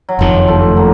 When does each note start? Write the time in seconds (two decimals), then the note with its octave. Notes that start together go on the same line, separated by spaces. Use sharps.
0.09 F#3
0.19 F#1 F2 D#3 F3
0.48 F3 A3
0.77 F#3 A#3